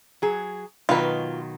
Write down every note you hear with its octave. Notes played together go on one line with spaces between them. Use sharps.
F#3 G#4
B2 D#3 F#3 F4 B4